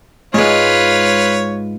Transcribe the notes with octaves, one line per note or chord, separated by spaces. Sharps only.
G#2 G#3 F4 B4 C#5